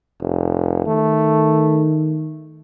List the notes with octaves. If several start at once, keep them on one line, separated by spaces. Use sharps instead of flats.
F1
D#3 A3